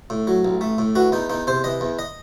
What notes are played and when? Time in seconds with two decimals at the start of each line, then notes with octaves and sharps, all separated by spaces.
0.10 A2
0.27 F#3
0.45 A1
0.61 A3
0.78 A2
0.95 E3 F#4
1.12 E2 D#4
1.30 E2 D#4
1.47 C3 C5
1.64 E3 D#5
1.81 E2
1.99 D#5